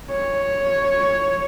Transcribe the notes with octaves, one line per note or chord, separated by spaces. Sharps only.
C#5